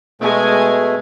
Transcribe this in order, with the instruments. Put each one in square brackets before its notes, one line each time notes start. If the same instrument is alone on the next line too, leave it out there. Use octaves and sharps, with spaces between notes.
[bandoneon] B2 A3 [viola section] G#3 G#5